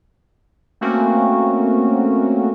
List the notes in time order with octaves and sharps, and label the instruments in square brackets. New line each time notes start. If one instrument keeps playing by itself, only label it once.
[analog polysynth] A3 A#3 C4 C#4 F#4 A#4